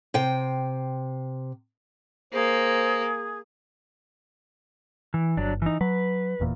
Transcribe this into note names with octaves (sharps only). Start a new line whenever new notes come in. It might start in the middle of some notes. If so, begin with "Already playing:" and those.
C3 G5
A#3 G#4 C5
E3
G1 F#3 D4
E3 D#4
F#3 B4
F1 E2 A#2